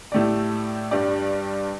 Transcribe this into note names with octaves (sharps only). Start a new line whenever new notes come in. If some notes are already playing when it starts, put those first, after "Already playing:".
A2 A3 G4 D5
G2 G3 D4 G4 D5